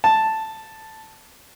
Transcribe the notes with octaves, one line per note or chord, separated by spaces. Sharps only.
A5